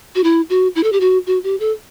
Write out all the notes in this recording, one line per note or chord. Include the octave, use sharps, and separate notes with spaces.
F#4
E4
F#4
E4
A4
G4
F#4
F#4
G4
A4